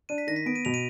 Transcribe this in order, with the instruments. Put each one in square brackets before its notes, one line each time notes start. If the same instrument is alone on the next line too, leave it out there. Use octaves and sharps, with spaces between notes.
[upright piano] D4 [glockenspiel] D#7
[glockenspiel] B6
[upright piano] D#3 [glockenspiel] A#6
[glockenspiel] B6
[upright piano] B3 [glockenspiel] D7
[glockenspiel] D#7
[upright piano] B2 [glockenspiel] F7
[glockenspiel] D#7